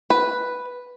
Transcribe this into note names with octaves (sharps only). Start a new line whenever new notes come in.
B4